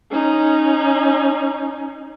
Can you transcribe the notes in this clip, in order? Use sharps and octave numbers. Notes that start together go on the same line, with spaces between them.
C#4 D#4